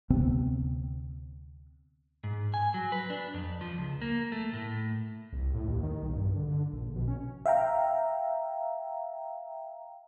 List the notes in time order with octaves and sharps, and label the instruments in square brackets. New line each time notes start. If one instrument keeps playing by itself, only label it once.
[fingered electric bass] D2 C3 B3 C4
[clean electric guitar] G#2
G#5
F#3
B4
D4
F2
F3
C#2
A#3
A3
A2
[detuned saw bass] C2
A2
D#2
D#3
B1
G2
D3
A#1
B2
C#4
[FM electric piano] E5 F5 G5 A#5